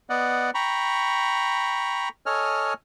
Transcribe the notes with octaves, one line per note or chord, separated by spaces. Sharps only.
B3 D5 D#5 F#5
G5 A#5 B5 C#6
A4 C#5 D#5 G#5 F6